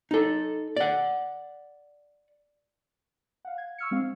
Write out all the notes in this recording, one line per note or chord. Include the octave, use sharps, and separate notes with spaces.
D#4 A4
D5 F#5
F5 F#5
G#6
C#6 E6 F6 G#6 C#7
G#3 C4 F5